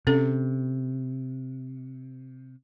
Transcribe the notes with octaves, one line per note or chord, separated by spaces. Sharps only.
C3 C#4 A4